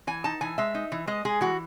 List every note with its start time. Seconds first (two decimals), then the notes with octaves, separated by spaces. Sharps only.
0.07 E3 G#5
0.24 D#4 A5
0.41 E3 G#5
0.58 G#3 E5
0.75 D#4
0.92 E3
1.07 G#3 D#5
1.25 G#3 G#4
1.41 E3 F#4